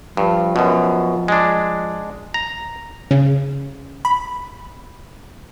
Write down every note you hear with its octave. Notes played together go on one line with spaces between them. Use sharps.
G2 F3
F#2 B2
G#3 D4
A#5
C#3
B5